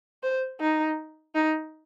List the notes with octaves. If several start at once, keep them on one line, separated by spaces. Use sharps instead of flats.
C5
D#4
D#4